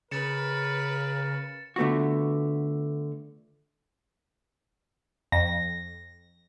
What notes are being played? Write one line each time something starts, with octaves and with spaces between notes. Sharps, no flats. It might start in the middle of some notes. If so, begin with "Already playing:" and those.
C#3 A#4 B4 A6 C#7 E7
D3 A3 B3 F4 F#4
F2 A#6